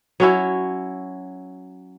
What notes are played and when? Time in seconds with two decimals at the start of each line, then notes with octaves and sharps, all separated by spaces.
0.20 F#3 C#4 E4